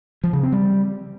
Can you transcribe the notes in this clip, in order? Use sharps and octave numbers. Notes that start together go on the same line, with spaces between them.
F3
C#3
C4
G3